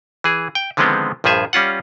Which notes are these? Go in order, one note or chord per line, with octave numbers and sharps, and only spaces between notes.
E3 G#4
G5
D3 D#3 F3 G#3 B3 C4
A#1 G2 F3 G#4 E5
G3 C#4 F4 F#5